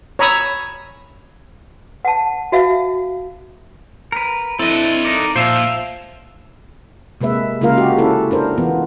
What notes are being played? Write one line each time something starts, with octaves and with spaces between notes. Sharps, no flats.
C#5 A#5 B5 D#6 E6
F#5 A5
F#4 E5 F5
A#4 B4
C4 D4 E4 A4 D#5
D#4 A#4 D5
A#2 F3 C5 E5 F5
C3 G#3 A#3 B4 E5
C#3 G#3 A#3 F4 A#4 F5
F#4 G4
C#4 E4 A4 B4
D4 A#4 C5
E3 B3 F4